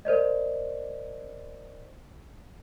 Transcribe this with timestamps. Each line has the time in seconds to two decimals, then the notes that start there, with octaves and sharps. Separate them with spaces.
0.05 A#4 C5 D5 D#5